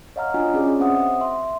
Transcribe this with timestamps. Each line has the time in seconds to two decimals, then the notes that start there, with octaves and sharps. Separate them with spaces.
0.16 C#5 D#5 F5 F#5 A#5 F6
0.34 D4 F4 F#4 D#5 F5 G#5
0.54 C#4 F#4 G#4 C#5 D5
0.80 C4 C5 E5 F#5 D#6
1.21 E5 C6